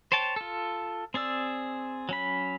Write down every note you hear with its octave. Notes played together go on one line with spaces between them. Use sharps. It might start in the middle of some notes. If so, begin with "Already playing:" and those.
C5 C#5 G5 A5
F4 A4
C4 G#4 D5 E6
F#3 C#4 B5